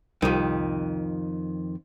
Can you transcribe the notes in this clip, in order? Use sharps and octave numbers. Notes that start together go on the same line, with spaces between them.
C2 F2 D#3